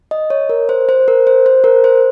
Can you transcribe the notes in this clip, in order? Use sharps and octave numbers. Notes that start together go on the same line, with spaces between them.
D#5
C#5
A#4
C5
C5
A#4
C5
C5
A#4
C5